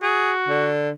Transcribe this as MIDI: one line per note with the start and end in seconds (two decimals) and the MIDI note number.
0.02 0.68 66
0.02 0.32 68
0.49 0.90 50